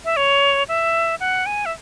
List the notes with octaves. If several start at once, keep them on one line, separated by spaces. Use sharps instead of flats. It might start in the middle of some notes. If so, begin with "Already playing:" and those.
E5
C#5
E5
F#5
G#5
E5